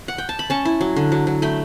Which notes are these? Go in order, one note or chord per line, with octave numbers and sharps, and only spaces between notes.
F#5
G5
A5
B5
C#4 A5 C#6
E4
F#3
D3
F#3
F#3
A3 G5 B5